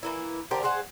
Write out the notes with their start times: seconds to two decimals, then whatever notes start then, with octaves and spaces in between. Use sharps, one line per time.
0.03 E3 A#3 E4
0.51 D3 G4 A#4 C5
0.63 G#4 C5 F5 F#5